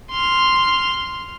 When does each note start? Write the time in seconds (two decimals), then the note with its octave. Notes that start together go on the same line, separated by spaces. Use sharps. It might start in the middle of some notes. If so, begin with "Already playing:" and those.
0.10 C6 F6